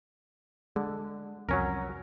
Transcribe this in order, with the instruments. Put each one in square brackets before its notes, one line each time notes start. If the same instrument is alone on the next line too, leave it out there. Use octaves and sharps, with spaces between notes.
[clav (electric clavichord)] D3 [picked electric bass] G#3
[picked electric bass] C2 F2 [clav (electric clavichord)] F#3 C#4 A#4